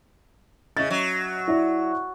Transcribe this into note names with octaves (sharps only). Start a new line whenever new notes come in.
C#3 D#5 E5 A6
F#3
E4 D5 E5